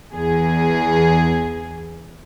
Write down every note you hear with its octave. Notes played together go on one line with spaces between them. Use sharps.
E2 G#4